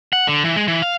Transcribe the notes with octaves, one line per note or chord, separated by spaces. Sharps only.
F#5
D3
E3
G#3
E3
F5